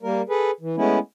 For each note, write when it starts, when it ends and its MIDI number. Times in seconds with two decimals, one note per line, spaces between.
0.03 0.22 55
0.03 0.22 58
0.03 0.22 70
0.29 0.51 68
0.29 0.51 69
0.29 0.51 71
0.61 0.76 52
0.76 0.99 56
0.76 0.99 57
0.76 0.99 59
0.76 0.99 61
0.76 0.99 64